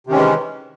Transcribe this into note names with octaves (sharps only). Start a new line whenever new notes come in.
C3 D#3 E3 G#3 C#4